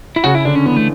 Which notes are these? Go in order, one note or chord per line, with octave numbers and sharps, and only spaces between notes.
E4
C#3 F#4
E4
D3 D4
C#4
E3 B3
A3